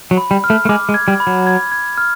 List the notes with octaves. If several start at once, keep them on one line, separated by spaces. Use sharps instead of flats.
F#3
B5
G3
F6
A3
A3
G#3 D6
G#3
G#6
G3
B5
F#3
G#6
G#6
F6